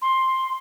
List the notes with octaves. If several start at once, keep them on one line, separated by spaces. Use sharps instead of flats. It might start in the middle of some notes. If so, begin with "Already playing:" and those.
C6